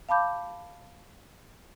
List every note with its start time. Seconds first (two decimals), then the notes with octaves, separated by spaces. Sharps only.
0.09 F5 A5 B5 D6 G6